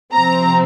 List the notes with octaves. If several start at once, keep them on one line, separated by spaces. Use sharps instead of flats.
C3 F3 C4 A#5